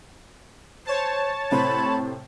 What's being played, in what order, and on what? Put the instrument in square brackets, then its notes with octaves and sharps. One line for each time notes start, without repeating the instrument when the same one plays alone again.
[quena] C5 [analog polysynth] C#5 A5
[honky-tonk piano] A2 C3 C5 [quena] B5